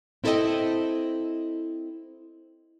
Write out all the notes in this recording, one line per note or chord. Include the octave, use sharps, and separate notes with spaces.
C4 E4 A4 C5 D#5 G5